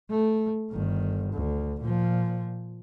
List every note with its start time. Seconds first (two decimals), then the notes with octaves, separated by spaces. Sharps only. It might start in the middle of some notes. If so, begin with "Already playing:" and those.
0.10 A3
0.72 G1 D#3
1.34 D2
1.81 A#2 F3